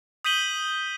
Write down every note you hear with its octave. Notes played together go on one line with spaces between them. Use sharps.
D#6 G6 B6 D#7 F#7 G7